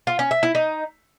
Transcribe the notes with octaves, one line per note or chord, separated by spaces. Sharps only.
F4
C#4
E5
E4
D#4